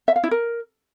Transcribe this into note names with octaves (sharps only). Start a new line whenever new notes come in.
E5
F5
E4
A#4